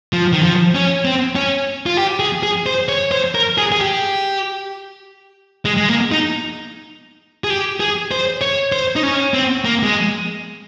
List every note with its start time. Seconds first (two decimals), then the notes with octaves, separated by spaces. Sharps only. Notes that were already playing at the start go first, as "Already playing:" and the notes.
0.13 F3
0.33 D#3
0.43 F3
0.75 C#4
1.05 C4
1.35 C#4
1.86 F4
1.97 G4
2.20 G#4
2.43 G#4
2.66 C5
2.89 C#5
3.12 C5
3.35 A#4
3.58 G#4
3.72 G#4
3.81 G4
5.65 G#3
5.77 G#3
5.89 A#3
6.12 D#4
7.44 G#4
7.50 G4
7.80 G#4
8.11 C5
8.41 C#5
8.72 C5
8.96 D#4
9.03 C#4
9.34 C4
9.65 A#3
9.83 G#3